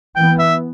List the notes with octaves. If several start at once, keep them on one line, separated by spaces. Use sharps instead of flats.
E3 B3 G5
E5